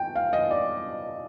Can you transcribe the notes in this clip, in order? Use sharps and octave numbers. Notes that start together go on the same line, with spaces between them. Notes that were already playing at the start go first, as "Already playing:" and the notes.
Already playing: G5
F5
D#5
D5